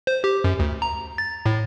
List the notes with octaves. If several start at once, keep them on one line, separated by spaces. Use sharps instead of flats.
C5
G4
F#2
D2
A#5
A6
A2